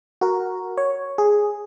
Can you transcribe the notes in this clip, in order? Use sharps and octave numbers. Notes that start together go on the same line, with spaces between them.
F#4 A#4
C#5
G#4